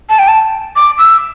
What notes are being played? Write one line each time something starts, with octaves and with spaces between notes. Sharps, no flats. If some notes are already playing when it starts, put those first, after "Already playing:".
A5
G5
A5
D6
E6